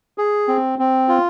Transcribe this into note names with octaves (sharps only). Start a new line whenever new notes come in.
G#4
C4
C4
F4